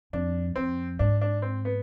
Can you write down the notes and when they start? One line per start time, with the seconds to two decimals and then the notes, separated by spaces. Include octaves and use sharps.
0.13 F2 D4
0.56 F2 C4
0.99 G#2 D4
1.21 D4
1.42 C4
1.65 B3